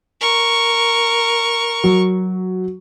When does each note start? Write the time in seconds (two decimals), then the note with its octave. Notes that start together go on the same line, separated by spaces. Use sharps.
0.21 A#4 C#6
1.84 F#3